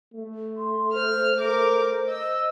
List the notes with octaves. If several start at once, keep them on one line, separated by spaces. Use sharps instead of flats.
A3
C6
C5 F6
A#4 D6
D#5 E6